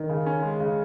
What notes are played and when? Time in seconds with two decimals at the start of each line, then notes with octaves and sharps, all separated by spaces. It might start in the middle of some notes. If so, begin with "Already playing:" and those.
Already playing: D#3
0.09 C#3
0.26 C#4
0.42 G#3
0.60 C#3